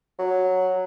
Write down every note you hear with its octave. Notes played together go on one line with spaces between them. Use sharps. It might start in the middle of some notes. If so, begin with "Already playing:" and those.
F#3